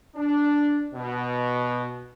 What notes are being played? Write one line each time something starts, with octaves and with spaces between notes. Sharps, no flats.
D4
B2